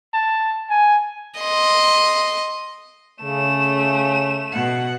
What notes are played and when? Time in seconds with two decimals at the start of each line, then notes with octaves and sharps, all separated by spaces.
0.14 A5
0.70 G#5
1.40 D#5 C6
3.23 C#3 A3 E7
4.52 B2 F#5